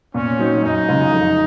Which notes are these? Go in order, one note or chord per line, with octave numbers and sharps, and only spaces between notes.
A#2 C#4
F#3 C4 D#4
F#2 D#4
C#3 G#3 C#4 F4
F1